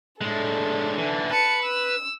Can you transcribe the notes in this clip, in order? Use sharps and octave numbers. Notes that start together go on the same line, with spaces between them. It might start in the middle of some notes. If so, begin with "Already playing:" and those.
A2 G#3 D4 A4
D3 E3
B4 A5 C#7
E6